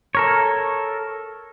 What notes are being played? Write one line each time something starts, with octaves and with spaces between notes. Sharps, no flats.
A4 A#4 C#5